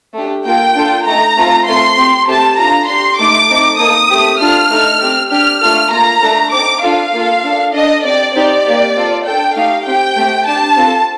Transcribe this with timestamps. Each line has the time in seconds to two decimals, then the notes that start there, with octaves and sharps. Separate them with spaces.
0.15 A3 D4 G4
0.45 A#3 F4 A4 G5
0.76 D4 F4 A4
1.06 A3 D#4 A4 A#5
1.37 A3 C4 F4 A4
1.67 A3 C4 F4 A4 C6
1.98 C4 G4
2.28 A3 C4 G4 A5
2.58 D4 F4 A4 A#5
2.89 D4 G4 C6
3.19 A3 D#4 A4 D6
3.50 A3 C4 D#4 A4
3.79 A#3 D#4 A4 D#6
4.10 A3 C4 G4
4.40 D4 F4 A4 F6
4.70 A3 D#4 A4
5.01 C4 G4
5.31 D4 G4 F6
5.61 A3 D4 F4 A4 F6
5.92 A#3 F4 A4 A#5
6.22 A3 D4 A4
6.53 C4 D#4 A4 D6
6.83 D4 F4 A4 F5
7.13 A#3 F4 A4
7.44 D4 A4
7.74 D4 A4 D#5
8.04 C4 G4 D5
8.34 C4 D#4 G4 D5
8.65 A#3 D#4 G4
8.95 C4 F4 A4
9.26 D4 A4 G5
9.56 A3 D#4 G4 F5
9.86 C4 G4 G5
10.17 A3 C4 G4
10.47 D4 G4 A5
10.78 C4 F4 A4